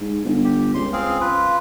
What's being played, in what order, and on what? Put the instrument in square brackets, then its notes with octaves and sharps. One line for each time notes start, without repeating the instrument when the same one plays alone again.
[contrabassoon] G#2
G1
[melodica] G4
[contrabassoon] C#2 [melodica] C6
[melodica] C4 G#4 F5
F4 B4